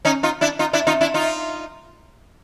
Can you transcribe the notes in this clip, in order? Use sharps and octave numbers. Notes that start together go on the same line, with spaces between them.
C#4 D#4
D#4 F4
D4 E4
D#4 F4
D4 E4
D#4 F4
D4 E4
D#4 F4